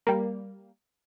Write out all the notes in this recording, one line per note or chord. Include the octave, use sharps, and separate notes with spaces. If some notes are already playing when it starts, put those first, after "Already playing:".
G3 A#3